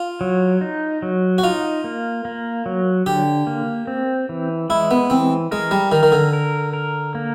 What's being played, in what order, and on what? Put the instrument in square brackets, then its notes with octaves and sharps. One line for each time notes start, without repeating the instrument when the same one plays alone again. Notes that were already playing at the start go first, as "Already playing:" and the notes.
Already playing: [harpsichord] F4
[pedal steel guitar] F#3
D#4
F#3
[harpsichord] F#4
[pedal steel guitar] D#4 [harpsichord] F4
[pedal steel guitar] A#3
A#3
F#3
[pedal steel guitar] D3 [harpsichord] G4
[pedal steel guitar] A#3
C4
E3
[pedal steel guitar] G#3 [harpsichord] E4
[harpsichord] B3
[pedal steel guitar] E3 [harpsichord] C4
[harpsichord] G#3 [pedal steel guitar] A#4
[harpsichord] G3
[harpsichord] D#3 [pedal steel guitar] A#4
[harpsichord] D#3
D3
[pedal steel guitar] A#4
A#4
A#3